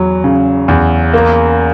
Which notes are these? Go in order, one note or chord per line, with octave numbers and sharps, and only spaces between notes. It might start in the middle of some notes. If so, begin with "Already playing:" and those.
Already playing: E2 F#3
C#3
E2
A#3